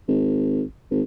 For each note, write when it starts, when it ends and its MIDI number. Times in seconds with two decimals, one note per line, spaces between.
0.08 0.63 32
0.91 1.02 32